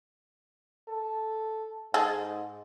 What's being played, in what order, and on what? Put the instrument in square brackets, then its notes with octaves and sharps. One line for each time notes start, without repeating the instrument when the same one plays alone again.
[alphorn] A4
[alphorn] G#2 [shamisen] G#4 A4